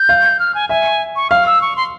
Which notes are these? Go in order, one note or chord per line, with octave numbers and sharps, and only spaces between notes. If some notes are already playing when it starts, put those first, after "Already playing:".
Already playing: G6
F5
F6
G#5
E5 G#5
C#6
F5 F6
E6
C#6
C6